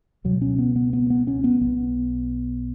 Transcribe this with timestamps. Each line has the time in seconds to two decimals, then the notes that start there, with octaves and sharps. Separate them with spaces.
0.24 C#2 B2 F#3
0.42 C#4
0.59 B3
0.76 B3
0.93 B3
1.10 B3
1.27 C#4
1.44 B3
1.61 B1 B2 B3